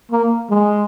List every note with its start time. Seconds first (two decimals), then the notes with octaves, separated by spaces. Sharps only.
0.12 A#3
0.50 G#3